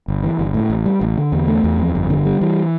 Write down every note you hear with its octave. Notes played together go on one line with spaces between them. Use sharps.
G1
E3
G1
A2
A1
G3
A1
D3
E2
A3
E2
F2
G1
D3
G3
E3